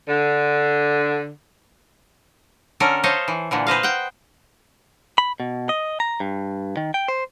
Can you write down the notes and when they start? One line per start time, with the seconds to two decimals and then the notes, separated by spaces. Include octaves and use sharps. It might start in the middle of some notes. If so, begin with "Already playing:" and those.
0.08 D3
2.80 D3 C#4 A4 A#4 G#5
3.03 A4 C5 C#5 D#5 F5
3.28 E3
3.51 A#2 D3 E3
3.67 B4 C5 D#5 F5
3.83 F#5 G5
5.18 B5
5.40 B2
5.69 D#5
6.00 A#5
6.20 G2
6.77 D#3
6.94 G5
7.08 C5